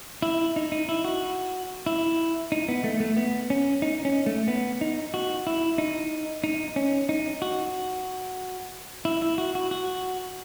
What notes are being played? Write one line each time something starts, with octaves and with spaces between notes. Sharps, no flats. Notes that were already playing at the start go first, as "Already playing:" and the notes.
E4
D#4
D#4
E4
F#4
E4
D#4
B3
A3
A3
B3
C#4
D#4
C#4
A3
B3
D#4
F#4
E4
D#4
D#4
C#4
D#4
F#4
E4
E4
F#4
F#4
F#4